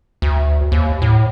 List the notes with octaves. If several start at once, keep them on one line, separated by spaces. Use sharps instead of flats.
D2
D#2
A2